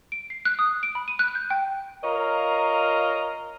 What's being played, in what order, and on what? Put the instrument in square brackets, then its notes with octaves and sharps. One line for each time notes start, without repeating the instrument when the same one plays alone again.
[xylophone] D7
C7
F#6
D#6
D7
B5
D#7
F#6
G6
G5
[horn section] F4 A#4 C#5 D#5 F5 A#5